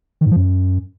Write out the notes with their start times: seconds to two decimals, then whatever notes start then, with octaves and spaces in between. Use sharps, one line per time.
0.21 D#3
0.26 G#2
0.31 F3
0.36 F#2